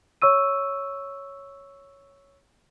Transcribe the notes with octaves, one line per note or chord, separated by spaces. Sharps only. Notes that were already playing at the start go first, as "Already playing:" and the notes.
C#5 C#6 E6 D#7